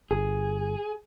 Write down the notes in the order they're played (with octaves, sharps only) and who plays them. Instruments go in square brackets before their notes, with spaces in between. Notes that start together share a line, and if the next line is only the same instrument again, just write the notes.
[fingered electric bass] G1 [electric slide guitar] G#4